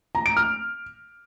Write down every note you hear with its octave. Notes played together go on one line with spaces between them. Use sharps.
A#5
D7
F6